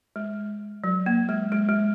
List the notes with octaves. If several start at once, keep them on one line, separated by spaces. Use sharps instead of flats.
G#3
F#3
A#3
G#3
G#3
G#3